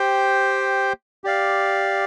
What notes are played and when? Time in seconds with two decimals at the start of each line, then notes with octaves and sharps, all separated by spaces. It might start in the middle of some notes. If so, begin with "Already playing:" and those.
Already playing: G4 C5 G5
1.24 G4 D5 F5